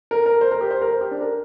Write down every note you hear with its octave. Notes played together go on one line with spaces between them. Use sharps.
A#4
A#4
C5
A#4
G4
C5
A#4
C5
G4
D4
A#4